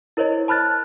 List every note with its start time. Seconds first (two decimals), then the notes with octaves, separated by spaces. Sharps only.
0.17 E4 A#4 C5 C#5 D#5
0.48 A5 B5 F6 F#6 A6